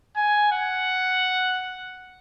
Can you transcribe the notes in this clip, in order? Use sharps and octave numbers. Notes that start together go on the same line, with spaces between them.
G#5
F#5